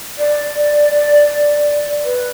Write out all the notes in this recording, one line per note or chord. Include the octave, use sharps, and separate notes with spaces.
D5
B4